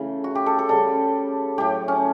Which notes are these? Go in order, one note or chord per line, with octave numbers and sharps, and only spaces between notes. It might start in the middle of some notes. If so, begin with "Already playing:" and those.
Already playing: C#3 E3 A3
F#4
G4
A4
A4
C#3 G3 A4
A2 F#3 A3 G4
C#4